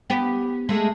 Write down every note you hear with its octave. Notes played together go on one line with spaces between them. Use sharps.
B3 G4
G#3 A3